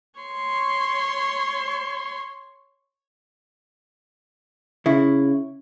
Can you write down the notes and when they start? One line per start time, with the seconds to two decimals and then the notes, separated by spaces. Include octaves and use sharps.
0.20 C#5 C6
4.86 C#3 E4